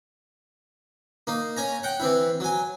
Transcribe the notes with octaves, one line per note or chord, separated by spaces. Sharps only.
A#3 D#4
C#4 G#5 A#5
F#5 G5
E3 C4 E4
F#3 G#5